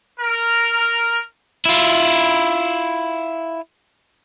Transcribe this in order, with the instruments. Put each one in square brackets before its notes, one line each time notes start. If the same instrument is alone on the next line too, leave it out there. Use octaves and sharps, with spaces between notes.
[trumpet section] A#4
[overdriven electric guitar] E4 F4